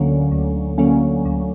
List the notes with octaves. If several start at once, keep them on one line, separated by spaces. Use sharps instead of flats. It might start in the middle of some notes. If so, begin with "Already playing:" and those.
Already playing: D2 D3 F#3 A#3 C#4
D2
D3 F#3 A#3 C#4
D2